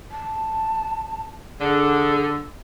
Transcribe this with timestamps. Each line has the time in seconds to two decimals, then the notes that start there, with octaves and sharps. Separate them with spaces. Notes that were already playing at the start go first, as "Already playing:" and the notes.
0.11 A5
1.60 D3 G#4